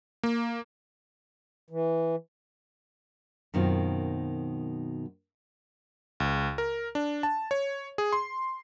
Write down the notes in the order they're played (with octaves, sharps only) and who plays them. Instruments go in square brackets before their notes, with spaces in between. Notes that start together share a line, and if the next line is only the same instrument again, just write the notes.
[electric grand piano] A#3
[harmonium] E3
[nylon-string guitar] F#2 B2 D#3 C4 F4
[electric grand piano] C#2
A#4
D4
A5
C#5
G#4
C6